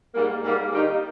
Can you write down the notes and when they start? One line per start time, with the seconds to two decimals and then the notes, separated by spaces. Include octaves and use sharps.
0.14 G#2 G3 A#3
0.43 G#2 G3 A#3
0.71 D#3 G3 A#3 D#4 G4